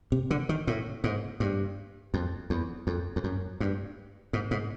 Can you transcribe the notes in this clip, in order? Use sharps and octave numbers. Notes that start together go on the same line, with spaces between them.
C3
D3
D#3
A2
G#2
G2
F2
E2
F2
F2
F#2
G2
G#2
G#2